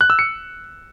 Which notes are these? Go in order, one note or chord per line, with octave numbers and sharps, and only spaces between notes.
F#6
E6
C#7